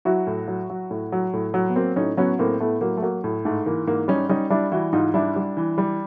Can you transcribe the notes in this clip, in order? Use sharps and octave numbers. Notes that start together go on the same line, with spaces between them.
F#3 E4 F#4
A2
F#3
F#3
A2
F#3
A2
F#3
B3
F#3 A#3 C4
A2 C#4 D#4
F#3 B3 C#4
A2 A#3 C4
A2 A3 B3
F#3 A#3
A3
F#3 A#3
A2
G#2 A3
E3 A#3
G#2 A#3
G3 C#4 D#4
G3 C#4 D#4
G3 D4 E4
E3 E4 F#4
G#2 D#4 F4
G3 D4 E4
G3
E3
G3